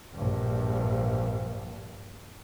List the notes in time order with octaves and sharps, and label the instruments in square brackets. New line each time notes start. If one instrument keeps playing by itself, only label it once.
[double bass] A#1 G2